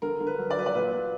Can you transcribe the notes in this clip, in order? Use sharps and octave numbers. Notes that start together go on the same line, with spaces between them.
D3 A#4
D3
B4
F#3
D5
F#3 B4
D5
A#2 B4
A#2